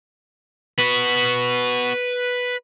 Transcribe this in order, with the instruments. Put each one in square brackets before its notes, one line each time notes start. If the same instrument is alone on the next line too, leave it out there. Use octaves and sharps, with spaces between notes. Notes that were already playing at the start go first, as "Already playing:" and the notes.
[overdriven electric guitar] B3 F#4 [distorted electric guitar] B4